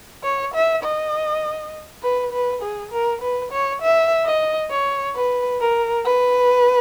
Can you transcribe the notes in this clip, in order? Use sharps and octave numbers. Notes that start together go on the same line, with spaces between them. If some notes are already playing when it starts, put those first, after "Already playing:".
C#5
E5
D#5
B4
B4
G#4
A#4
B4
C#5
E5
D#5
C#5
B4
A#4
B4